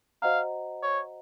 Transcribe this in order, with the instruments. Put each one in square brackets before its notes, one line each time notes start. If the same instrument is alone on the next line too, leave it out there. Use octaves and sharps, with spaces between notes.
[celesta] F#4 C5 D#5 F#5 A#5 [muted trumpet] F5
[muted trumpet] C#5